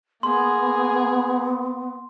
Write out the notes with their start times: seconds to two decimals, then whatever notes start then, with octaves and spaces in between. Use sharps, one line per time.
0.23 A#3 B3 G#4 C6